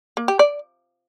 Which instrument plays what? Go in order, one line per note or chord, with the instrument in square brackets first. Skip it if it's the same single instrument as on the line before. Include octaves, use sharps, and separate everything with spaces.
[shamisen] A#3
G4
D5